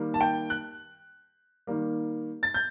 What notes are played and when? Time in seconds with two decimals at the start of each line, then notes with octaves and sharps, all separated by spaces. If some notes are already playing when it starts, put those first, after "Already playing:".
Already playing: D#3 G3 A#3
0.14 A5
0.21 G5
0.50 F#6
1.67 D#3 G3 A#3
2.43 A6
2.54 G6